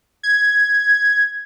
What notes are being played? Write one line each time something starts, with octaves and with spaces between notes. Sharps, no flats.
G#6